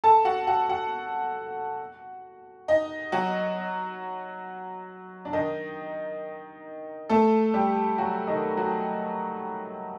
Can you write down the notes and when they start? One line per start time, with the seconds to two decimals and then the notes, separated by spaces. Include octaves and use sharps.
0.04 A4 A5
0.25 F#4 F#5
0.47 F#4 F#5
0.69 F#4 F#5
2.68 D#4 D#5
3.12 F#3 F#4
5.25 D4
5.33 D#3 D#4
7.10 A3 A4
7.54 G3 G4
7.98 F#3 F#4
8.27 D#3 D#4
8.57 F#3 F#4